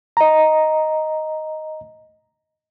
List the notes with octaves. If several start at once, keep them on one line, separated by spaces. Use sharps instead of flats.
D#5 A#5